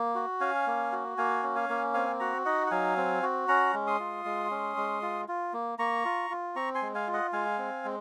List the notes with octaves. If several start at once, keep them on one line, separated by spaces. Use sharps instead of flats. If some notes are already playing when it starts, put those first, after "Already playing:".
Already playing: A#3
F#4
C#4 F5 G#5
A#3
F#4
A#3 F5 G#5
C#4
F5 G#5
A#3
C4 F5 G#5
F#4 F#5 A#5
D#4 D#5 F#5
F#5
F#3 F5 G#5
C4
F#4
C#4 F#5 A#5
G#3
C6 D#6
F4
G#3
C#4
G#3
F4
F4
A#3
A#3 A#5 C#6
F4
F4
C4 A#5 C#6
G#5 C6
G#3
F5 G#5
F4
D#5 F#5
G#3 F5 G#5
C4
G#3